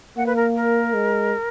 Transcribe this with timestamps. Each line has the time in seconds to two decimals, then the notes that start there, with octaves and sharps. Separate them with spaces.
0.17 A#3 F#5
0.26 B4
0.36 A#4
0.55 A#4
0.94 G#3